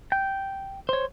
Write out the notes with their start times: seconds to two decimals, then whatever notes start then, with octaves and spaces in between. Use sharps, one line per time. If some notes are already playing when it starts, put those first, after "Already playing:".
0.12 G5
0.89 C5 C#5